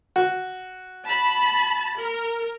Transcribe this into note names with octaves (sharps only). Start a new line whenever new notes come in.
F#4
A5 B5
A#4